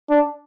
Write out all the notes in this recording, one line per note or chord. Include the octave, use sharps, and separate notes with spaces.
D4